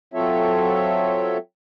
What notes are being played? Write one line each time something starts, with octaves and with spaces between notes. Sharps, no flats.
F#3 C4 F4 A4 C#5 E5